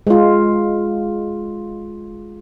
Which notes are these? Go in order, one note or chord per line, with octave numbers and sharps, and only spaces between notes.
G#3 F4